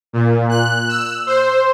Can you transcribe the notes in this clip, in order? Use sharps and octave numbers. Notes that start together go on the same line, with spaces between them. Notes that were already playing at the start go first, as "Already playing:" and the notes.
A#2
F#6
E6
C5